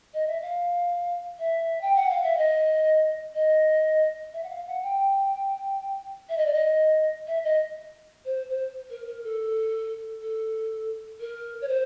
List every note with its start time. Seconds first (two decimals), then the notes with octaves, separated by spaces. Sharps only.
0.14 D#5
0.27 E5
0.41 F5
1.39 E5
1.81 G5
1.95 F#5
2.09 F5
2.23 E5
2.37 D#5
3.35 D#5
4.33 E5
4.44 F#5
4.49 F5
4.67 F#5
4.82 G5
6.29 E5
6.37 D#5
6.45 D5
6.53 D#5
7.27 E5
7.44 D#5
8.25 C5
8.50 C5
8.90 A#4
9.07 A#4
9.24 A4
10.22 A4
11.20 A#4
11.61 C#5
11.68 C5